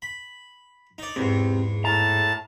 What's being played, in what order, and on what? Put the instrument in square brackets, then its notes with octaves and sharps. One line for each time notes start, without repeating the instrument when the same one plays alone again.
[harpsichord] B5
D#4 D5
[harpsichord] E2 G#2 [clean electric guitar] C3
[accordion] A2 A5 [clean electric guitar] A#5